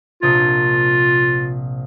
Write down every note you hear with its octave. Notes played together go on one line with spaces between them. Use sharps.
A#1 C3 F4 D#6